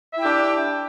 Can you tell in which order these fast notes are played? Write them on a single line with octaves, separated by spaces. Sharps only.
E5 E4 G5 G4 D4